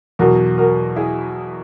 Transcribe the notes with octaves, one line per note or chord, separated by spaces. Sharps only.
E2 B2 F#3 F#4 A#4
F#4 A#4
E4 G#4